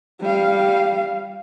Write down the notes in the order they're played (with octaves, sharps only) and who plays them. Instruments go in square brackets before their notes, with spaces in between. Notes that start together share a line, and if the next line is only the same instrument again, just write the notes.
[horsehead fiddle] G3 F5